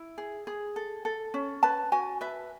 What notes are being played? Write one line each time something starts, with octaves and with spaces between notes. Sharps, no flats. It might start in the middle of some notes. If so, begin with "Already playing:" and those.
Already playing: E4
G#4
G#4
A4
A4
C#4
B4 A5
F#4 G#5
B4 E5